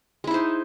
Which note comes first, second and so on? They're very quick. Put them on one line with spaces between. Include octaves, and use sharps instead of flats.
G#3 E4 D#4 C5